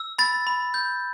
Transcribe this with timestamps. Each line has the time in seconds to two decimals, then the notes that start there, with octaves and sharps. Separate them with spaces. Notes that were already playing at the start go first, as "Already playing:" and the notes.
Already playing: E6
0.19 B5 A6
0.47 B5
0.74 G6